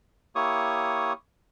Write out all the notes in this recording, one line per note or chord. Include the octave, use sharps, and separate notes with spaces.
A#3 E4 G4 C#5 C#6 D#6